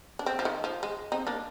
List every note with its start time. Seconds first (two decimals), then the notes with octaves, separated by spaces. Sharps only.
0.19 D4
0.26 C4
0.39 F3
0.45 D#3
0.64 F3
0.83 G#3
1.12 C4 D#4
1.27 A#3 D4